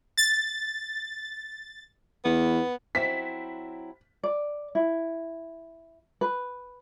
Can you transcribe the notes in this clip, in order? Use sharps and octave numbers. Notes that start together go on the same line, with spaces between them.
A6
E2 B3
F#3 C4 E4 B6
D5
E4
B4